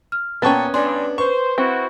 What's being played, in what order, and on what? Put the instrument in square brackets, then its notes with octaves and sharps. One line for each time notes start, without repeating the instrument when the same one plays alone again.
[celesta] F6
[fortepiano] A#2 A5 C#6 [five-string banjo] B3 C#4 [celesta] G5 A6
[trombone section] G2 [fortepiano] D4 [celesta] D5 G#5 C6
[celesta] B4 [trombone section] C5 [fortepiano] C#6
[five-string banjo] C4 [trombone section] E4 F#4